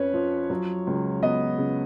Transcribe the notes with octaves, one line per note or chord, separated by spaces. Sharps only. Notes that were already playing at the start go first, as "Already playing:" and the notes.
Already playing: F2 C#4 B4 C#5
F3
F#3
C#2
B3 D#5
C#3